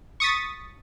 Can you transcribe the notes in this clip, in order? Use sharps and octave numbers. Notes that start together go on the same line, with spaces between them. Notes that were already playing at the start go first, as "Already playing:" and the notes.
C#6 D#6 A6 B6